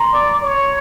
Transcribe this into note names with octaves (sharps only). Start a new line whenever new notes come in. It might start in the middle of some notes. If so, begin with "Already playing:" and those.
Already playing: A#5 C6
D5
C#5